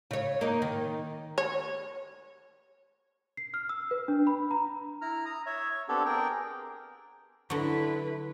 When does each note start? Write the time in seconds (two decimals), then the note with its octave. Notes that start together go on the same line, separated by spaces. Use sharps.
0.11 C#3 C#5
0.41 A#3 D#4
0.62 D#3
1.38 C#5
3.37 C7
3.54 F6
3.69 E6
3.91 B4
4.08 D4
4.27 B5
4.51 A#5
5.01 E4 A#5 F6
5.26 A#5 D#6
5.46 C#5 E5
5.71 C#6
5.88 B3 C4 D4 G4 A4
6.06 G#4 A#4 G5
7.50 D3 F#3 E4 B4